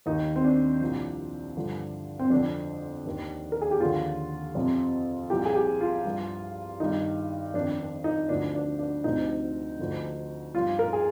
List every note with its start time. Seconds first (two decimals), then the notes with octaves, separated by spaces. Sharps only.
0.06 D#2 D#3 D#4
0.36 C4
0.44 D4
0.81 C2 A#2 F3
1.56 G2 D3 F3
2.19 C4
2.30 F2 D3 F3 D4
3.06 D#2 D#3
3.52 A#4
3.61 G#4
3.71 G4
3.80 D#2 D3 F3 F4
4.55 F2 C3 F3
5.30 C2 A#2 F3 G4
5.45 G#4
5.55 G4
5.81 F4
6.05 G2 F3
6.80 G2 D#3 D#4
7.54 F2 D#3 D4
7.80 D4
8.04 D#4
8.29 D2 D3 F3 D4
8.55 D4
8.79 D4
9.04 D2 C3 F3 D#4
9.79 D2 D3 F3
10.55 G2 F3 F4
10.79 A#4
10.93 G#4